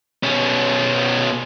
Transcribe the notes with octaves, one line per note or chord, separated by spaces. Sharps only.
B2 C#4